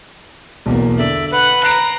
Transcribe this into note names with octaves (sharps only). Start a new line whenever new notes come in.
B1 E2 A#3
D3 D5 E5
B4 F#5
A#5 F#6 C7 D7